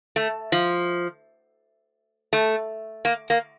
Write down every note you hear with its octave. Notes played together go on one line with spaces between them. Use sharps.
A3
F3
A3
A#3
A#3